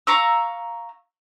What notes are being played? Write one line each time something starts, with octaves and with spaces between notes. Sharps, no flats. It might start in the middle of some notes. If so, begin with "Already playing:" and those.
F5 A#5 C#6 E6